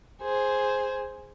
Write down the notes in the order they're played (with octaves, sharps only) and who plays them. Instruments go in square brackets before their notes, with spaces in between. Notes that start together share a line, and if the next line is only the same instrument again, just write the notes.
[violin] G#4 C5